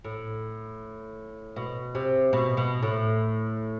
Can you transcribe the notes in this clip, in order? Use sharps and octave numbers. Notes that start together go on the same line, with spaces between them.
A2
B2
C3
B2
B2
A2